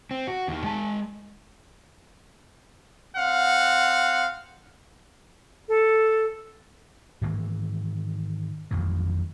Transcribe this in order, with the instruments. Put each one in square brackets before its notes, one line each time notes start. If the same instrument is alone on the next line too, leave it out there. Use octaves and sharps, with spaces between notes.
[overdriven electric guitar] C4
F#4
D#2 D#3
G#3 A5
[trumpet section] C4 F5 F#5
[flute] A4
[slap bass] G#2 D#3 E3 A#3
A1 F2 D#3 F#3